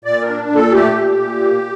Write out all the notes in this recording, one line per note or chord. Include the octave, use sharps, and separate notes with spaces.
A#2 D5
D4 A#4
A#2
A4
A3 G4
A#2
A#2
A#3